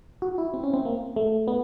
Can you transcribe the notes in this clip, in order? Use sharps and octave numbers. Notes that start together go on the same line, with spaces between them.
F#4
E4
C4
C#4
C4
A#3
A3
B3